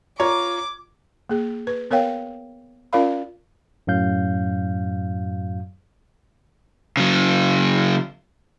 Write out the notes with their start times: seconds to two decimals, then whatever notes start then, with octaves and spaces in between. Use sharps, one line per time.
0.20 F4 C#5 A#5 D6
1.30 A#3 G#4
1.67 B4
1.91 B3 A#4 C#5 F5 G5
2.93 C#4 F4 A#4 D5 F5 B5
3.87 F#2 A2 F#3 F5 G6
6.97 C#3 F#3